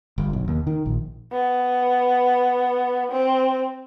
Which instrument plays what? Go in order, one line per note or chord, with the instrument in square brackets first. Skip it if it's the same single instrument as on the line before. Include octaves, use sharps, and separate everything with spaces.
[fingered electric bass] G1
B1
D#2
D#3
A#1
[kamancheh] B3
C4